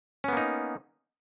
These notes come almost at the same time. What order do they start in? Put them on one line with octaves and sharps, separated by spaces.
C#4 B3 A#3 D#4